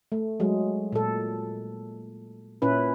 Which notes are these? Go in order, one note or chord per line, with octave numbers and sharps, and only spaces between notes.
A3
F#3 G#3
A#2 A4
A#2 C#4 E4 B4